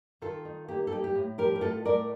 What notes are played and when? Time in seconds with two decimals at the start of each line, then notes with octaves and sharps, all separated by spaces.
0.22 D#3 F4 A4
0.45 D#4
0.68 A#3 G4
0.87 A4
0.92 D#4 G4
1.04 G4
1.15 A2
1.38 F3 G4 A#4
1.56 G4
1.61 A2 F4 A4
1.85 A3 A#4 D5